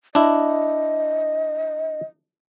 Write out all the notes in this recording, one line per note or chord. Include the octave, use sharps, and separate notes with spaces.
D4 E4 D#5